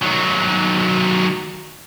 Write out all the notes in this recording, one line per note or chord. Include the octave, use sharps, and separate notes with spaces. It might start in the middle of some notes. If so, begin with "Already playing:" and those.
D#3 F#3